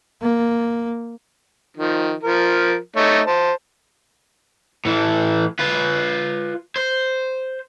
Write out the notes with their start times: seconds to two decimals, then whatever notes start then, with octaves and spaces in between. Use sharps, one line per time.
0.21 A#3
1.77 D#3 F3
2.23 F3 A#4
2.96 A3 D#4 C#5
3.27 C5 A5
4.85 A2 E3
5.59 F4 B4
6.76 C5